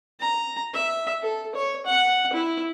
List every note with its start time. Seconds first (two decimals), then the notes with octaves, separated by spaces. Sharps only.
0.20 A#5
0.74 E5
1.22 A4
1.55 C#5
1.86 F#5
2.33 E4